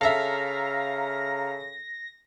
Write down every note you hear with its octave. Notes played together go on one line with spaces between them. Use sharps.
C#3 A4 E5 F5 A#5 A#6